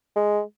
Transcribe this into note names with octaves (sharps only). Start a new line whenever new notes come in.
G#3